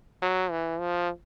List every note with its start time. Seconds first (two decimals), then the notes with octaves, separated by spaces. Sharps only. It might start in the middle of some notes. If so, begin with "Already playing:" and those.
0.22 F#3
0.51 E3
0.80 F3